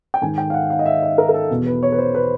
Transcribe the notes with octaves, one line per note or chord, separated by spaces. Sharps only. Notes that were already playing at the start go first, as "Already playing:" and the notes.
G5
G#2 D#3 G#5
G5
F5
F#5
F5
D#5
E5
D#5
A#4
A#4
A4
E2 B2
B4
C#5
B4
C5
B4